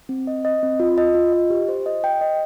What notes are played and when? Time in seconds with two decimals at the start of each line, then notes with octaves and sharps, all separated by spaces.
0.09 C4
0.27 D#5
0.45 D#5
0.63 C4
0.80 F4
0.98 D#5
1.15 F4
1.33 D#5
1.50 G4
1.69 C5
1.86 D#5
2.04 G5
2.21 D#5